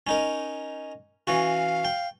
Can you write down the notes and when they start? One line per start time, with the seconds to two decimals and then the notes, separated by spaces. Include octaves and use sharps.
0.07 C#4 D#4 A#4
1.27 E3 C#4 F#4 F5
1.85 G5